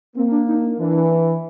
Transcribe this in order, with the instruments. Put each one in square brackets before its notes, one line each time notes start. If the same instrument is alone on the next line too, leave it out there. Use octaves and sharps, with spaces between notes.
[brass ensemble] A#3 [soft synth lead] C4
[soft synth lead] D4
D#4
[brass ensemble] E3 [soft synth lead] D4